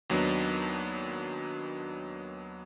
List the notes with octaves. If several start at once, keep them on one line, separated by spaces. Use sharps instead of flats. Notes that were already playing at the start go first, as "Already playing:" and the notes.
D#2 F#3 B3 D4 D#4